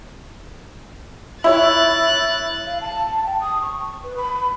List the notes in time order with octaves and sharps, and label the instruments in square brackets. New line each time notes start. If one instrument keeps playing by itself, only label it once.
[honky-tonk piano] E4 C#5 [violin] F#6 A6
[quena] F5
A5
G5
D#6
C#6
B4
B5